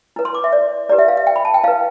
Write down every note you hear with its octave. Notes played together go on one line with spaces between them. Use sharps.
E4 B4
C6
D6
E5
D5
E4 G4 B4 D5
E5
F5
E5
G5
B5
A5
G5
E4 B4 F5